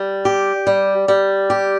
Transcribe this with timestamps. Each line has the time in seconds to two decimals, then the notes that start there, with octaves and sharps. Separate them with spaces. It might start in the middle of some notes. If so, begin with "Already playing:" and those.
Already playing: G3
0.25 G4
0.67 G3
1.08 G3
1.50 G4